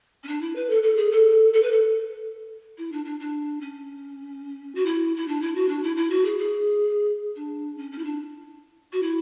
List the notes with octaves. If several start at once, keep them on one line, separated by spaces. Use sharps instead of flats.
C#4
D4
E4
B4
A4
A4
G#4
A4
A4
B4
A4
E4
D4
D4
D4
C#4
F#4
E4
E4
D4
E4
F#4
D4
E4
E4
F#4
G#4
G#4
D4
C#4
C#4
E4
D4
F#4
E4